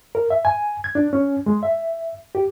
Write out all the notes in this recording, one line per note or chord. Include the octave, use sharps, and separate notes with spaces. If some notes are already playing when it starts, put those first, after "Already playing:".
A#4
E5
G#5
G#6
D4
C#4
G#3
E5
G4